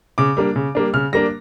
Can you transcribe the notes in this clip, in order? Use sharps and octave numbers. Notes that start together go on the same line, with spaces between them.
C#3 D6
G3 A#3 D4
C#3
G3 A#3 D4
C#3 F6
G3 A#3 D4 A#6